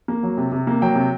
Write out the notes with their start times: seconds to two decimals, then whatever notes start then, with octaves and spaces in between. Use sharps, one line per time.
0.08 A#3
0.23 F#3
0.38 C3
0.52 C3
0.67 A#3
0.82 F#3 G5
0.96 C3